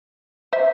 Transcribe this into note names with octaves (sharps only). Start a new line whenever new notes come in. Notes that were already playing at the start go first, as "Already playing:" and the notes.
C5 E5